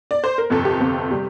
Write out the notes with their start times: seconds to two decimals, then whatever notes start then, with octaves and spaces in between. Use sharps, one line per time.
0.11 D5
0.24 C5
0.38 A#4
0.50 G1 F2 C3 A4
0.65 G4
0.80 G1 F2 C3
1.11 C3 G3